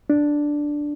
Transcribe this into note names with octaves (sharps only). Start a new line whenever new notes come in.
D4